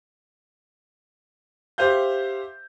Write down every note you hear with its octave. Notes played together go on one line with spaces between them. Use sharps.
G4 C5 E5 F5 G6